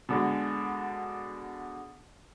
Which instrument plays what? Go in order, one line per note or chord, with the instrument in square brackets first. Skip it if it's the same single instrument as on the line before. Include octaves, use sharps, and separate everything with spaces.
[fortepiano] B2 D3 G#3